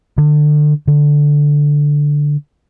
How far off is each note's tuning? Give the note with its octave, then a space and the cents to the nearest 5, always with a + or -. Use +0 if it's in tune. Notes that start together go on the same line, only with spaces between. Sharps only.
D3 +25
D3 -5